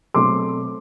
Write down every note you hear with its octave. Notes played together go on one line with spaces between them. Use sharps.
B2 F#3 A3 C4 C6 D6